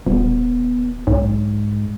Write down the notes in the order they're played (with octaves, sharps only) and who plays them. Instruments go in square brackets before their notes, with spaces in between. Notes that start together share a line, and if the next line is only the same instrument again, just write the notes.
[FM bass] D#1 [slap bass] B3
[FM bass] B1 [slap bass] G#2